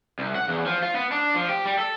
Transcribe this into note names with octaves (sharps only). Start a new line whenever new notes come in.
C2
F#5
E2
F3
F4
B3
D4
F3
G4
G3
A4